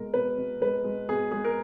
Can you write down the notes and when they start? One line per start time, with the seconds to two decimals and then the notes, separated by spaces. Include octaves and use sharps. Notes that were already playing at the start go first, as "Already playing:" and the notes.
Already playing: B2 G#3 A#4
0.14 B2 B4
0.38 B2
0.61 G#3 B4
0.84 G#3
1.09 B2 G#4
1.32 G#3 G#4
1.44 A#4